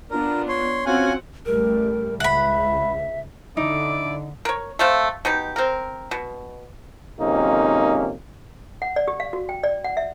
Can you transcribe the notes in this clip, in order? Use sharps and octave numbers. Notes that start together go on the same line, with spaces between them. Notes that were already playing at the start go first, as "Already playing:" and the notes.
B3 D4 F4 A#4
C#5 C6
C4 C#4 F4 F#4 F#5 G#5
A1 G3 A3 A#4
C#2 E5 F#5 B5
D3 D#4 E4 D5 D6
A#4 C#5
A3 C4 F5
B2 D#4 G4
C4 A#4
B2
G#1 F2 C3 A#3 C#4 D#4
F#5
D5
G4
F5
F#4
G5
D5
F#5
E5